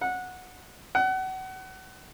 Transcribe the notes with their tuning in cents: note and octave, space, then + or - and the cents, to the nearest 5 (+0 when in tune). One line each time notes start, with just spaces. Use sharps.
F#5 -15
F#5 +30